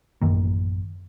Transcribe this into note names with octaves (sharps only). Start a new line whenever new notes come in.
A1 F#2 D#3 A#3